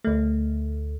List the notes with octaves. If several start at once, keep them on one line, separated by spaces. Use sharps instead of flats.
D2 A3